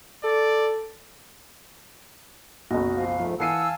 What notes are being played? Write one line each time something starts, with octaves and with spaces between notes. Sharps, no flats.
A4 D5
F#1 B1 F#4 D#5
F3 F5
G#2 F3 A3
E3 F5 F#5 G#5 A5 E6 C7 D#7